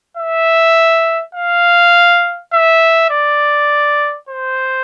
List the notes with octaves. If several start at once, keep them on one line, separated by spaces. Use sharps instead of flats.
E5
F5
E5
D5
C5